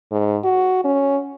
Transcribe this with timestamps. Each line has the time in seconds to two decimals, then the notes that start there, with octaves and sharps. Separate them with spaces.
0.11 G#2
0.44 F#4
0.84 C#4